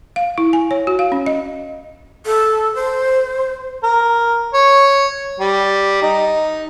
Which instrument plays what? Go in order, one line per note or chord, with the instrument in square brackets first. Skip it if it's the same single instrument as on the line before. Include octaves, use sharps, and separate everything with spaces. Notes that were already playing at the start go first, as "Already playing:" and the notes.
[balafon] F5
E4
G#5
C#5
F#4
F5
C#4
D#5
[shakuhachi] A4
C5
[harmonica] A#4
C#5
G3
D#4